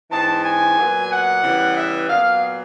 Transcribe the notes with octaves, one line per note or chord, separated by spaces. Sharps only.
G#2 E3 G#3 C4 A5
G#5
A#2 F#3 B3
F#5
C#3 E3 G3 B3
E5
A#2 F#3 B3 F5